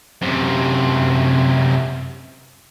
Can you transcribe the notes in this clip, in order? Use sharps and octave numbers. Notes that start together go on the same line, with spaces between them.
F#2 C3